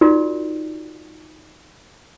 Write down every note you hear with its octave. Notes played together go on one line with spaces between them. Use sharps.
D#4 F4 F#4 A#4 D5